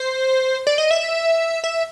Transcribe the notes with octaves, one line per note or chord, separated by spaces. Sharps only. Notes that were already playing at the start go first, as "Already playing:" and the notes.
Already playing: C5
D5
D#5
E5
E5